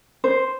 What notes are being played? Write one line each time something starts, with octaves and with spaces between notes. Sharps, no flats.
C5